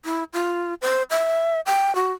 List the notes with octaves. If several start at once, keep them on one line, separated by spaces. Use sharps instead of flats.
E4
F4
C5
E5
G5
F#4